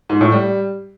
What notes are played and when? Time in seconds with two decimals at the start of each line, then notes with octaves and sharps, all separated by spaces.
0.09 G#2
0.21 A2
0.32 G3